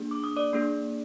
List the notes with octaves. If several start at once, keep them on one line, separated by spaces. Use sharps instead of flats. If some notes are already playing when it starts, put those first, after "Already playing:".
Already playing: A#3 D4 G#4
D6
D#6
D5 D6
A#3 D4 G#4